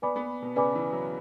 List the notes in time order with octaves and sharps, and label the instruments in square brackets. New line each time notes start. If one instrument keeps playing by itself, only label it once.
[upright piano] B3 [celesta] B4 D5 G#5 B5 D6
[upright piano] B3
B2
[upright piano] C#3 [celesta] B4 D5 G#5 B5 D6
[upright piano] E3
F#3